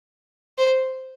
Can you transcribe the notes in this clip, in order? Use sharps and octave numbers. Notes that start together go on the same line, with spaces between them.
C5